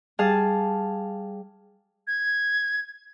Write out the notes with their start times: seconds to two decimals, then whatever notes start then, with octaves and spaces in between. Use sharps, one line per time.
0.19 G3 G#4 F5 A5
2.07 G#6